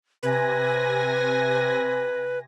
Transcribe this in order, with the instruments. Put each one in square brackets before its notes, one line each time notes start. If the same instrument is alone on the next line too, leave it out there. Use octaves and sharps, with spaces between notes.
[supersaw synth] C3 G#5 A#6 [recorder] B4